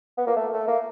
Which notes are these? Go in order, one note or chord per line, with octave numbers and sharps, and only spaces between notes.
B3
A#3
A3
A3
A#3